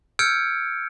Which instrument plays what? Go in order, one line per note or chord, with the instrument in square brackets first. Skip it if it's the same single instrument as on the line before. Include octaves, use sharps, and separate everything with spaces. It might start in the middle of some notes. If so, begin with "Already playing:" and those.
[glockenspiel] E6 F6 G6 G#6 C#7 D7